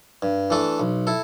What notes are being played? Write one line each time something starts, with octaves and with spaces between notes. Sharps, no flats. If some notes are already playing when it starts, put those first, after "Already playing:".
G2
E3 A3 D4 A4
B1
E4 A4